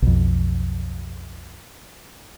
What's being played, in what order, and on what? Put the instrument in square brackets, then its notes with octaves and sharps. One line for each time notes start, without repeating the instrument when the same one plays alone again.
[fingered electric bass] B1 F2